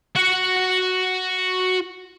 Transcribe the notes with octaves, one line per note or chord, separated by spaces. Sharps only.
F#4 F#5